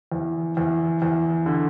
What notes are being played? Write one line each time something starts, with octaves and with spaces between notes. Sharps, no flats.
E2
E2
E2
D3